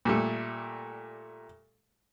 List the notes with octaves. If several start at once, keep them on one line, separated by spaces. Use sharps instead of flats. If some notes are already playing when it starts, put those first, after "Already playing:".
A#2 G3 A3